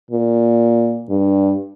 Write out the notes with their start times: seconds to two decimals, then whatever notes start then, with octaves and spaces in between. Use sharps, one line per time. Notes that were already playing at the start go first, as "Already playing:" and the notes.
0.11 A#2
1.10 G2